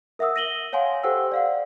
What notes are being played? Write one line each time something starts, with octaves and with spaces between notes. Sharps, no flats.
A#4 E5 F#5 D#6 E6
A#6 D#7 F#7 G7
C#5 F5 F#5 G#5 C6
G4 A4 C5 F#5 G5 E6
D5 F5 F#5